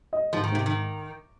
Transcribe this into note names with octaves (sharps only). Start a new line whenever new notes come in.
D#5
G#2 F3
D#3
G#2 C3
D#3